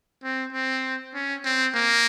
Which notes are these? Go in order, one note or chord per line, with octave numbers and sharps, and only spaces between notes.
C4
C4
C#4
C4
A#3